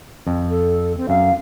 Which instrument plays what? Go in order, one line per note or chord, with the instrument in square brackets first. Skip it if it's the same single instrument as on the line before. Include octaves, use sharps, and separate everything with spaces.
[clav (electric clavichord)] F2
[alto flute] A4
C4
[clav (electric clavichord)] F#2 [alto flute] F5